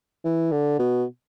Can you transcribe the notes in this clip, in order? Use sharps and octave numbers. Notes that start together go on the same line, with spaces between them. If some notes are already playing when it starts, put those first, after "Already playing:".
E3
D3
B2